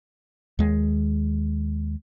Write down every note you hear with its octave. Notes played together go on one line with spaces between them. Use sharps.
D#2 G#3